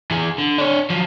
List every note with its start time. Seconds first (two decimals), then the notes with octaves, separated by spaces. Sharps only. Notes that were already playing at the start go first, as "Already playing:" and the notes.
0.11 E3 G#4
0.38 D3
0.58 D4 C#5
0.90 F3 F#3